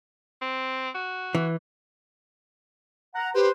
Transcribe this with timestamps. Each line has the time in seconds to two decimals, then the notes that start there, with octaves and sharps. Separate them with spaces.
0.42 C4
0.95 F#4
1.35 E3
3.15 F#5 A#5
3.35 G4 B4 C5